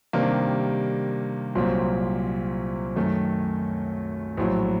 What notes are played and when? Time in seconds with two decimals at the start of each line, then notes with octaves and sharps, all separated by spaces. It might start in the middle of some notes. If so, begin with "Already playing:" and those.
0.13 C3 D#3 G3 A#3 D4
1.55 C2 A#2 F#3 C4
2.96 F#2 D#3 A3
4.37 A#1 A2 F#3